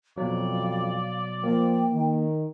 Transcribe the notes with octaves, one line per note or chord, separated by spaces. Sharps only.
F2 B2 F#3 D5 F5
F3 A#3 G5
D#3